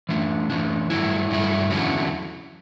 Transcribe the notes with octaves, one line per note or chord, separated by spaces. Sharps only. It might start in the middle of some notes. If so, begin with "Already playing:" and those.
E3 A3 D4
E3 A3 D4
G2 F#3 A3 E4
G2 F#3 A3 E4
E2 D3 F#3 C#4 E4